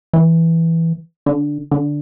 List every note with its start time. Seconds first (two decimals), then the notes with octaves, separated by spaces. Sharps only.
0.13 E3
1.26 D3
1.71 D3